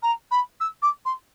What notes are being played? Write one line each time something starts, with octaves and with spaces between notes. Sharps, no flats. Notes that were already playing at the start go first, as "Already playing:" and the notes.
A#5
B5
E6
D6
C6